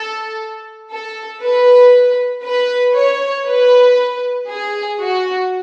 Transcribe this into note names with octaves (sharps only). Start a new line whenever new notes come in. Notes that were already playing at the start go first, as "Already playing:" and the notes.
Already playing: A4
A4
B4
B4
C#5
B4
G#4
F#4